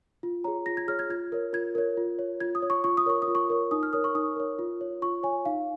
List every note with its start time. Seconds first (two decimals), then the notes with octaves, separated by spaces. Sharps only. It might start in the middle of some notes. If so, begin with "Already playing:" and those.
0.23 F4
0.44 G#4 C#5 A#5
0.66 F4 A#6
0.77 G#6
0.88 G#4 C#5 F6
0.99 G#6
1.09 F4 G#6
1.32 A#4 C#5
1.53 F4 G#6
1.75 A#4 C#5
1.97 F4
2.19 C#5
2.40 F4 G#6
2.55 D#6
2.62 C#5
2.70 C#6
2.84 F4 C#6
2.97 D#6
3.06 A#4 C#5 C#6
3.22 D#6
3.28 F4
3.35 C#6
3.50 A#4 C#5
3.71 D#4 D#6
3.83 F6
3.93 A#4 C#5 D#6
4.04 C#6
4.15 D#4 D#6
4.36 A#4 C#5
4.59 F4
4.81 C#5
5.02 F4 C#6
5.23 C#5 G#5
5.45 D#4 F5